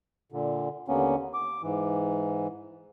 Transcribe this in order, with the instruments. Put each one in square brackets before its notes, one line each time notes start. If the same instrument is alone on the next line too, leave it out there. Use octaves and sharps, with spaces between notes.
[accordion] A#2 D3
D#2 D3 A#3 B3 C#4
D6
G#2 E3